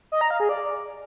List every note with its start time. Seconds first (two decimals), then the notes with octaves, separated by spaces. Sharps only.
0.12 D#5
0.21 A#5
0.30 F5
0.40 G#4
0.49 D5